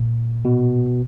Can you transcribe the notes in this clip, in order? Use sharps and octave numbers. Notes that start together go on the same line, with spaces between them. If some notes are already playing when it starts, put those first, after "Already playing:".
Already playing: A#2
B2